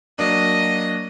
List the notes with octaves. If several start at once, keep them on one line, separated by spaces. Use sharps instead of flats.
F#3 A#3 D4 D#5